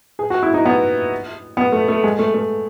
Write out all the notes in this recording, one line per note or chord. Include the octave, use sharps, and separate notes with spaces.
G#4
F#4
E4
D#4
B3
B3
A3
A3
G#3
A3
A3